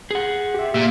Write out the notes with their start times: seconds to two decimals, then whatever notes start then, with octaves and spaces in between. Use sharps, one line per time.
0.11 G#4 F#5
0.54 G4 E5
0.74 A#2 E5 F5